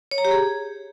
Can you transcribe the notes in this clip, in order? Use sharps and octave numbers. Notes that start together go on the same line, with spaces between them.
C#5
A#5
G4
G#4